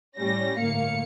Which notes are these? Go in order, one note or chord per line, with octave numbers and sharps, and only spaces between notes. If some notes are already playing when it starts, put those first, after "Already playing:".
A2 G3 C#4 A#6
G1 A2 A#3 F5 C#7